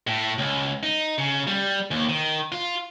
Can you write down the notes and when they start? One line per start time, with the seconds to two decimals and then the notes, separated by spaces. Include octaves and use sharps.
0.07 A2
0.38 C#2
0.83 D#4
1.18 C#3
1.47 G3
1.91 D#2
2.09 D#3
2.52 F4